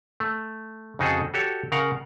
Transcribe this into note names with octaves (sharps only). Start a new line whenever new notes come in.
A3
F2 C#3 D#4 F#4 G#4 A4
F#4 G4 A4 C#5
C#3 A#4 F5 F#5